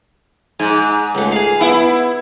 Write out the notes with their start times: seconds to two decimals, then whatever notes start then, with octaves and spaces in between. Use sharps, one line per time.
0.60 G#2 G#5
1.15 C#2 A3
1.32 G#4 F5
1.61 B3 E4